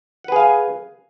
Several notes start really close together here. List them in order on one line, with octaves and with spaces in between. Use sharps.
F#5 B4 G#4 F5 G#5